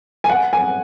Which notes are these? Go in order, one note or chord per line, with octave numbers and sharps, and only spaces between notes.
G#5
F#5
G#5